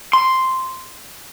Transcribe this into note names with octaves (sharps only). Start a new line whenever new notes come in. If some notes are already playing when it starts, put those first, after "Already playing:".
C6